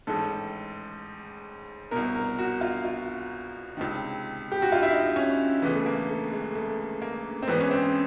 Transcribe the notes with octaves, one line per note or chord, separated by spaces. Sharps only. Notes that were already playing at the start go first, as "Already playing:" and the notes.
A1 G#2 D#3 A4
C2 B2 A#4
A#4
F#4
F4
F4
C#2 C3 D#3
G4
F#4
F4
E4
D#4
C#4
D2 C#3 E3 B3
A3
A#3
A3
G#3
A3
A#3
C4
G#1 G#2 E3 B3
C#4
C4